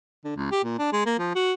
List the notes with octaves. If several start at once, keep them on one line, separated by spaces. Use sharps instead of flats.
D3
C#2
G4
A#2
D4
G#3
A#3
F3
F#4